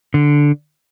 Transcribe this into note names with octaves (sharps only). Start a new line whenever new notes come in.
D3